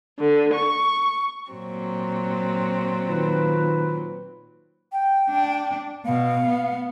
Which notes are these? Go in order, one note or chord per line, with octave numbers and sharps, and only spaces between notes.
D3
C#6
A#2 F#3 C4
D#3 F4 B4
G5
D4
B2 F5
B3